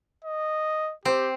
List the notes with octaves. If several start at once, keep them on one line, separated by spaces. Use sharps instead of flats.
D#5
C4 G4